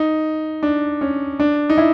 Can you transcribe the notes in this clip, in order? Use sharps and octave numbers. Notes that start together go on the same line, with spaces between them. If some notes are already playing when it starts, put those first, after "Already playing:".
Already playing: D#4
D4
C#4
D4
D#4
E4